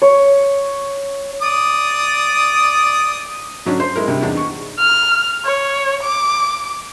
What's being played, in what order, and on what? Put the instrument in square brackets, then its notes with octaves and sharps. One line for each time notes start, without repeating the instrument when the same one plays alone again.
[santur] C#5
[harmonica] D5 D#6
[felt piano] D3 F#3 C#4 D4
C5
G#3 E4 A#4
G2 C3
E2 D4 D#4
C#6
[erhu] F6
C#5
D6